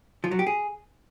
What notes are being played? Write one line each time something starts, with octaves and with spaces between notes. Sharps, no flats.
F3
F#3
G4
G#4